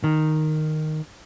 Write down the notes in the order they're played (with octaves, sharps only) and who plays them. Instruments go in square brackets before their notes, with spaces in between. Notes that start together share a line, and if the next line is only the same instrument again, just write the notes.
[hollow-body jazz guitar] D#3